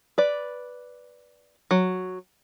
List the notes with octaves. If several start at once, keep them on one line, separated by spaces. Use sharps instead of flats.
B4 D5
F#3